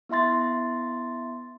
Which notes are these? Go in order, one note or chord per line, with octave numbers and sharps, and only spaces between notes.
B3 E4 E5 C6 A6